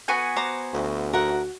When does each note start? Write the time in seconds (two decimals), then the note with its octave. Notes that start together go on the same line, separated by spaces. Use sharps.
0.08 B3 F#4 G#5
0.36 C5 A#5 D6
0.74 D2
1.13 F#4 A#4 F#5